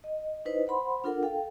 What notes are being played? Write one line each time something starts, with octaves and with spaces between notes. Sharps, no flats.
D#5
D#4 E4 B4 C5 D#5
C5 F#5 B5 C6
D4 F4 A4 A#4 F#5
A4 F5 G5